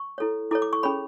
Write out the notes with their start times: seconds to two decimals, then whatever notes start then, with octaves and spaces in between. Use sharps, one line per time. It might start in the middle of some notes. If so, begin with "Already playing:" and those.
Already playing: C#6
0.18 E4 A4 C#5
0.51 E4 A4 C#5 D6
0.62 D6
0.73 C#6
0.83 C#4 G#4 C#5 B5